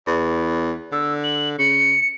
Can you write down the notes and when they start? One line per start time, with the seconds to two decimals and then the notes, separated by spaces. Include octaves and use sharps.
0.07 E2
0.92 D3 E6
1.23 F#7
1.58 C#3 C#7